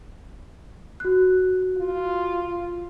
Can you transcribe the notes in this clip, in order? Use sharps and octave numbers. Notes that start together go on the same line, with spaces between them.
F#4 F#6
F4